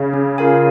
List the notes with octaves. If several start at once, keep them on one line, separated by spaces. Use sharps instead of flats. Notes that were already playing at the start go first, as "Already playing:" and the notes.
Already playing: C#3
C#4
F4 A#4 F5 G#5